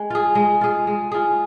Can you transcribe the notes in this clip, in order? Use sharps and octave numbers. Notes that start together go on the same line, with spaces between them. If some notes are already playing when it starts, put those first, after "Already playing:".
Already playing: G#3
F4 G#4
G#3
F4 G#4
G#3
F4 G#4